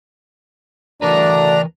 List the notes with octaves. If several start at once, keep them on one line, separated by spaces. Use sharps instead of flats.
D2 E3 D4 A#4 B4 D5 A#5